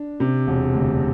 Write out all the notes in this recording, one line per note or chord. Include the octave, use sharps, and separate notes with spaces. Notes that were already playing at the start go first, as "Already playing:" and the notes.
Already playing: D4
C3
E1
D2